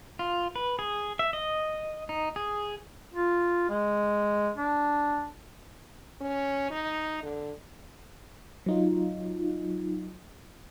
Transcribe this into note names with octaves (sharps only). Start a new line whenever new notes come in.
F4
B4
G#4
E5
D#5
D#4
G#4
F4
G#3
D4
C#4
D#4
D3
F#3 D#4 F4